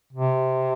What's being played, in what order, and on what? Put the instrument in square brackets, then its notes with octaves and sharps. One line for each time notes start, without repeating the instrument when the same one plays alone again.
[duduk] C3